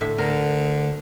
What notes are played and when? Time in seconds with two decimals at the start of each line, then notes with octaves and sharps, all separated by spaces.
0.01 A2 D3 E5
0.18 D2 D3 A#4